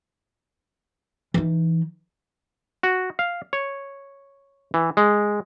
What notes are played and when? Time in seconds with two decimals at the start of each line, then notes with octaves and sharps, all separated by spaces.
1.34 E3 D#4
2.83 F#4
3.19 F5
3.53 C#5
4.74 E3
4.97 G#3